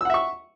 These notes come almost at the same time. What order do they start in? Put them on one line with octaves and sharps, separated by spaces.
E6 F#5 E5 C#6